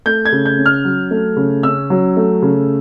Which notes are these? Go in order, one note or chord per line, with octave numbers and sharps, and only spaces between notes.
A3 G6
G#6
C#3
G6
C#4
F6
F#3
A3
C#3
C#4 E6
F#3
A3
C#3